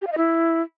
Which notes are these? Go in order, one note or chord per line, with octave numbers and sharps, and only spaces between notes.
G4
F5
D#5
E4